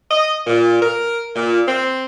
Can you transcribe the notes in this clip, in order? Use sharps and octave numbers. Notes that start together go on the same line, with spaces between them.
D#5
A#2
A#4
A#2
C4